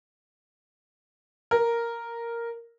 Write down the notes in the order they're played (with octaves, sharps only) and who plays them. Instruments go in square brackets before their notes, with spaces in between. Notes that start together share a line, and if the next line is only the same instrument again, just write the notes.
[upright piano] A#4